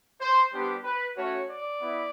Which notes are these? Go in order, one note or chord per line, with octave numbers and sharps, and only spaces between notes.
C5
G3 B3 D4 G4 C5
B4
A3 C#4 F#4 C#5
D5
B3 E4